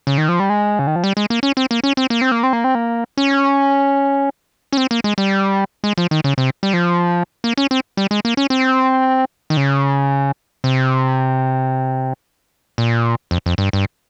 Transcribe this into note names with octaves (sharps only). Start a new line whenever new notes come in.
C#3
D#3
F3
G3
G#3
C#3
D#3
F3
G3
G#3
A#3
C#4
C4
A#3
C#4
C4
A#3
C4
A#3
C4
A#3
C4
A#3
C#4
C#4
C4
A#3
G#3
G3
G#3
F3
D#3
C#3
C3
G3
F3
A#3
C#4
C4
G3
G#3
A#3
C#4
C4
D#3
C#3
C3
A#2
F2
F2
G2
G2